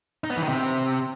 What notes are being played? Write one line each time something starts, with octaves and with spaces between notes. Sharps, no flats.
D#4
B3
E3
D#3
C3